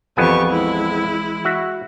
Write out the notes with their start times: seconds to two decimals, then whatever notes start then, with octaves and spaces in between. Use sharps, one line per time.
0.17 A#1 F2 E3 B3 G4 G#5 C#6
0.47 G#3 E4
1.45 F#4 E5